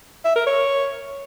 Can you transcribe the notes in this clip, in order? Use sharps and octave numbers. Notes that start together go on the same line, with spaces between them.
E5
A#4
C#5